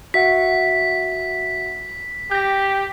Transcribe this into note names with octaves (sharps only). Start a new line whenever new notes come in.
F#4 E5 F#5 B6
G4 G6 A#6